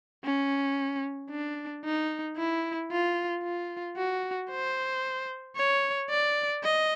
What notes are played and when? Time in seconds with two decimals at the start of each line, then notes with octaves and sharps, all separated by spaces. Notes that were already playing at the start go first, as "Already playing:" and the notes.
0.24 C#4
1.31 D4
1.85 D#4
2.37 E4
2.91 F4
3.44 F4
3.97 F#4
4.50 C5
5.57 C#5
6.10 D5
6.64 D#5